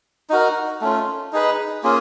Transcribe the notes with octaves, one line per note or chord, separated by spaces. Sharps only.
D#4 F#4 A#4
A3 C#4 F4
D#4 G#4 B4
A#3 C#4 F4 G#4